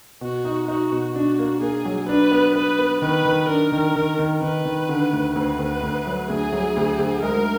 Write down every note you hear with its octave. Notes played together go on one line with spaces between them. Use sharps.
B2 F#4
D#4
D#4 F#4
B2
D4 F#4
A#3
A#3 G#4
F#3
D4 B4
B3
B3 B4
B3
D#3 B4
D#3
D4 A#4
D#3
D#3
D#3
D#3 B4
D#3
D3
D2
D2 B4
D2
D2
F#3
D2 G#4
F#3
D2
D2
G#3 A#4